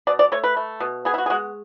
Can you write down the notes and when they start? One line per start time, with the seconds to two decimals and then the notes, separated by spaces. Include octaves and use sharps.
0.07 B2 D5
0.19 D5
0.32 A3 C#5
0.44 B4
0.57 A3
0.80 B2
1.05 B3 G#4
1.14 E4
1.18 F#4
1.26 G#4
1.30 G#3 F#4